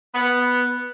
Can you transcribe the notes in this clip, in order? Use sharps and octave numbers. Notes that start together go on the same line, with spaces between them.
B3